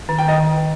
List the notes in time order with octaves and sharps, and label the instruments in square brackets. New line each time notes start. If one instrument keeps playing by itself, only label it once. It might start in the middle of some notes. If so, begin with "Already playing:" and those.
[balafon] D#3
[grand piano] G5
[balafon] D#3 [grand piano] D#5